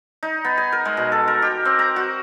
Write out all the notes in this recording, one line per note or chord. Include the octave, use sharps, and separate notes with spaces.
D#4
B3
G#5
A#4
G#3
B2
A4
A#4
G4
C4
A#5
F#4